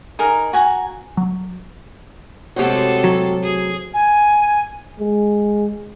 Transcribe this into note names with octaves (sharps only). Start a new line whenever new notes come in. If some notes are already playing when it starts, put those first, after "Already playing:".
D#4 G#4 A#4 A#5
F#4 G#5 A#5
F#3
A2 C3 G#3 F#4 G4 A4 C5 C#5
F#3
G#4
G#5
G#3